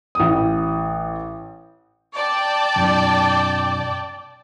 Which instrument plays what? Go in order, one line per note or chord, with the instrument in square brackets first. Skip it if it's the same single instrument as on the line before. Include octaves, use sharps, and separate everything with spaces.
[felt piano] A1 D#6
[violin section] D5 G5 A5
[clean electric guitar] B1 F#2